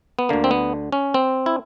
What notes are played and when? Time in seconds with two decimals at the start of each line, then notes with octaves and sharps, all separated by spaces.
0.19 B3
0.29 D2 D3 A#3
0.44 C4
0.51 B3
0.92 C#4
1.14 C4
1.46 E4